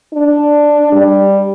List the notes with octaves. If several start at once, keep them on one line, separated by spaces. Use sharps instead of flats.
D4
G3